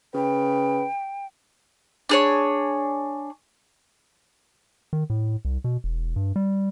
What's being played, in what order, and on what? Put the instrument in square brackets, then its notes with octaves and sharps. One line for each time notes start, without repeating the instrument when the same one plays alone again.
[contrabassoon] C#3 [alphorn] B4 [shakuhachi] G5
[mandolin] D4 G#4 C#5
[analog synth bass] D#3
A2
C2
B2
E1
G2
G3